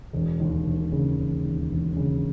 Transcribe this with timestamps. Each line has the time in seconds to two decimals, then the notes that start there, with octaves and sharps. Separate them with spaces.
0.13 E1
0.40 D#2
0.66 E1
0.92 C#3
1.18 E1
1.45 D#2
1.71 E1
1.97 C#3